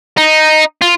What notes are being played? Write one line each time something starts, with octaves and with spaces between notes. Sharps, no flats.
D#4
F4